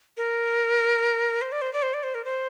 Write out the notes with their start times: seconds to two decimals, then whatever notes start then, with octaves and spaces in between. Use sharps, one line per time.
0.17 A#4
1.42 C5
1.52 D5
1.62 C5
1.73 D5
1.83 C5
1.94 D5
2.03 C5
2.15 A#4
2.25 C5